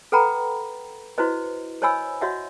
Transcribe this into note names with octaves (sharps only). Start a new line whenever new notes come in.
A4 B4 F#5 G5 A#5 B5
E4 F#4 B4 C5 D#5
C5 C#5 D#5 G#5 B5 E6
F#4 C#5 D#5 E5 F#5